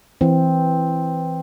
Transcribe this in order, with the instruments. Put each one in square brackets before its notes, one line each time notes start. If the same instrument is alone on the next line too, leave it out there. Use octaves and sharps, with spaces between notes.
[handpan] E3 C4